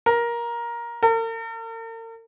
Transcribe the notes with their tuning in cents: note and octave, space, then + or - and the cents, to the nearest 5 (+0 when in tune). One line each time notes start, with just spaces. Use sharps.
A#4 +15
A#4 -45